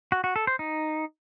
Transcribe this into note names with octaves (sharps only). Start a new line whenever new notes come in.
F#4
F#4
A4
C5
D#4